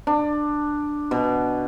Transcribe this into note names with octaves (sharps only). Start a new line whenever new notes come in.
D4
B2